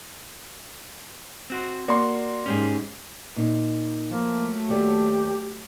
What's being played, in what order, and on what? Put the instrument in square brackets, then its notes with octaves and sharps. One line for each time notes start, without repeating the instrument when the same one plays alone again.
[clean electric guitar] C4 F#4 C5
[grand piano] A#3 C6 [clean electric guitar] F#4 [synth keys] D5
[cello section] G#2 [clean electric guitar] C#4 G4 G#4
[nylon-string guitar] A#2 D#4
[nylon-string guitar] F3 [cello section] F#3 A3 [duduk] A#3
[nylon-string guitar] D#2 A4 D5 [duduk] G4